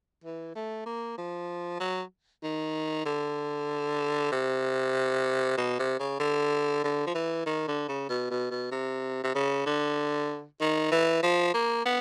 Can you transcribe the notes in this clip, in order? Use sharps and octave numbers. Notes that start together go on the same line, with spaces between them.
E3
A3
A#3
F3
F#3
D#3
D3
C3
B2
C3
C#3
D3
D3
F3
E3
D#3
D3
C#3
B2
B2
B2
C3
C3
C#3
D3
D#3
E3
F3
A#3
B3